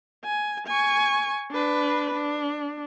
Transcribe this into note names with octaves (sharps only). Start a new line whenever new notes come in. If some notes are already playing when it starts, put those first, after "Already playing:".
G#5
G#5 C#6
D4 B4
D4